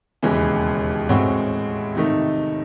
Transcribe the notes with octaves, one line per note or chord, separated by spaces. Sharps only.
E1 D#2 C#3 E3 G#3
A2 G#3 C4 F#4 C#5
C3 D#3 A3 D#4